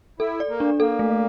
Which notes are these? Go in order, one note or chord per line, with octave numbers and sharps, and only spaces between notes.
E4 A4
D5
A#3
D4
A#3 A4
A3